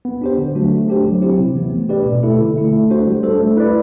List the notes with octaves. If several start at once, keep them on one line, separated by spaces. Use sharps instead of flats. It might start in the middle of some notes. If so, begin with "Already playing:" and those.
B3
D4 G4 C5
D3
F#3 A3 D4 F#4
A3
D4 G4 C5
F#3
C4 E4 G4 C5
C3
E3 B3
A3
D4 G4 B4 D5
B2
A3 E4 A4
D3
A3 E4
A3
D4 F#4 C5
G3
D4 A4 C5
A3
E4 B4 D5